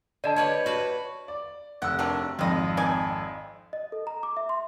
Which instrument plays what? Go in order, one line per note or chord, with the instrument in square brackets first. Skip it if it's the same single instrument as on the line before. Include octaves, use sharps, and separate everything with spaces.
[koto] D3 [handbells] D5 D#5 A5
[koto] G4 B4 C#5
F#4 B4
[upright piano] D5
[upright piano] F1 E6 [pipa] F#5
[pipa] D#3 F#3 D4
[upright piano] G#1 F2 [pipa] F4 D#5
[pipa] D#4 D5 G#5
[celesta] D#5
A4
A#5
D6
E5
C6